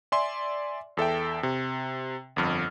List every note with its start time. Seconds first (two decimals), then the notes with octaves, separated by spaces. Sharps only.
0.12 D5 E5 G#5 C6
0.97 E2 A4 E5 G5
1.43 C3
2.36 G1 F2 F6